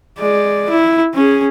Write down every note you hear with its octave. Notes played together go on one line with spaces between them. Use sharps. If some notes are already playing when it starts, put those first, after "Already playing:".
G#3 D5
E4
C#4 G#4